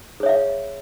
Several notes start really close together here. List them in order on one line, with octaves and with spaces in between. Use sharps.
G#4 C#5 E5 F5